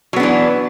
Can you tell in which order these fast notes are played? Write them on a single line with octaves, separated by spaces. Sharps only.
F#3 B3 D4 E3